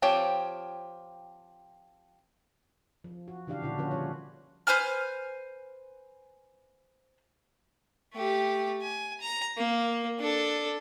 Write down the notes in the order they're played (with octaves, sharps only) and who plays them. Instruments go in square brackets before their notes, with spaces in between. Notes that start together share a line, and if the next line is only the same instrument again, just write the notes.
[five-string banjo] F3 C4 F4 G4 C#5
[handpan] F3
F#4
C#3 E3 D4 G4 F5
A#2 D3 D4 E4 F#4
D3 F3 C#4 F4 F#4 B4
F3 G3 C#4 C#5
[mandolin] B4 C5 G#5 F6
[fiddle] A3 G4
G#5
A#5
A#3
D4 A4